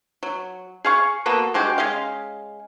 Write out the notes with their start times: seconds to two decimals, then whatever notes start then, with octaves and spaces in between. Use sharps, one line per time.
0.23 F#3
0.85 G#4 F5 C#6
1.26 A#3 B3 F#4 A4
1.54 D3 G#3 F#4 G4
1.78 G#3 C#4 D#5 F5